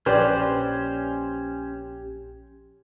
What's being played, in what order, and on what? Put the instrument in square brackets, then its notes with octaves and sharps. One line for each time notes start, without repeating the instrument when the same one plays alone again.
[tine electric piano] A#1 G4 [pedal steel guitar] C#4 C5 [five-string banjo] B4 D5